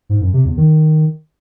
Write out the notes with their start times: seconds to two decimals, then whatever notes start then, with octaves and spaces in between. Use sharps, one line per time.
0.09 G#2
0.21 F#2
0.33 C3
0.45 E2
0.57 D#3